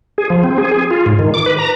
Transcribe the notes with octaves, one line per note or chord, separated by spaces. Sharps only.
G#4
F3
C4
G#4
G#4
F4
G#2
D#3
D6
B4
A#5